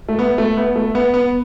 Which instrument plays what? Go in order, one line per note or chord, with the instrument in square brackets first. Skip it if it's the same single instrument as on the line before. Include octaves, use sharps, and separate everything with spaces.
[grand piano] A3
B3
A3
B3
A3
B3
B3